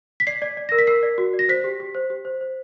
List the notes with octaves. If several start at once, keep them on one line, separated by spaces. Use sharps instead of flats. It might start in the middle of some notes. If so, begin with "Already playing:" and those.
B6
D5 C7
D5
D5
A#4 A#6
B6
A#4 C7
D5
F#4
D5
A#6
C5 B6
G4
G4
C5
G4
C5
C5